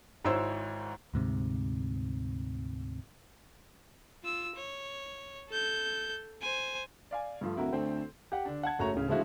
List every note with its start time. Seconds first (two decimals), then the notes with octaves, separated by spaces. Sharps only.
0.24 G#1 G#2 E4 C5 C#5 E6
1.14 D2 G#2 C3
4.23 F4 E6
4.56 C#5
5.50 A4 G6
6.42 C5 G#5
7.11 D5 F5 G#5
7.41 G2 F3 A3
7.57 D1 E4 F#4 A#4
7.73 D2 C4 A4 C5
8.32 G4 F#5
8.45 D3 D4
8.63 F#5 A5 G#6
8.79 F#1 A3 F#4 C#5 A#5 F7
8.93 D1 C#3
9.08 D3 F3 G#3 A3 E4 F#4